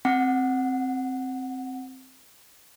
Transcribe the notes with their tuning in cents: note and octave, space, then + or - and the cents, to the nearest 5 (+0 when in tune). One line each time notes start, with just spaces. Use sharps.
C4 +0 F#5 +0